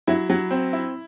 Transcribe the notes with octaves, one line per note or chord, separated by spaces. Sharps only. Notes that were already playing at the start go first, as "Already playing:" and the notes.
F#3 E4
F#3
C4
E4